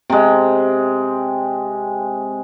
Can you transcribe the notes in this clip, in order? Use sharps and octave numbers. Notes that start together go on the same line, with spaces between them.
C3 G#3